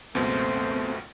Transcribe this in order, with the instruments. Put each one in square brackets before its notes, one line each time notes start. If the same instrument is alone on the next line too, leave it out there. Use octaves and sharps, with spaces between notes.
[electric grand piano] C#2 F#2 B2 [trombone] A3 [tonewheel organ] B3 C4 [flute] C5